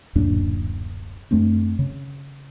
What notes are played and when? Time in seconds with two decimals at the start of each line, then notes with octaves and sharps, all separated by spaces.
0.15 D1 F#2 A#2 D4
1.31 F#2 A3 C4 D4
1.79 C#3